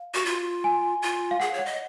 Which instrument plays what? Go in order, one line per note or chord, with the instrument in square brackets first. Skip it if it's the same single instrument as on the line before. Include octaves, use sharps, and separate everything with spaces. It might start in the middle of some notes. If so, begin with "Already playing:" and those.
Already playing: [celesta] F5
[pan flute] F#4
F4
[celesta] G#5
[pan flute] F4
[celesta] F5
[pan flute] G#4 [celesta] F#5
[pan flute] C#5
[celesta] F#5
[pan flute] D#5